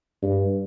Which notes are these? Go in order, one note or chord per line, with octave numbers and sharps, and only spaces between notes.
G2